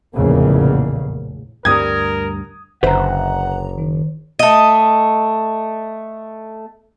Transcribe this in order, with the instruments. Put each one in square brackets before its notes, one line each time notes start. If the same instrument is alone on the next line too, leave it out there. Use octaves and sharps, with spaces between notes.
[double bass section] F1 A#1 E2 A2 C#3 A#3
[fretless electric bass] D2 G2 G3 [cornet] A#4 [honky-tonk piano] D#6 G#6
[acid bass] F#1 [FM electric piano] D3 A#5 [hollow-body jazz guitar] B4 C5 E5 [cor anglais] F#5
[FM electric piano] D#3
[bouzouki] A3 D#5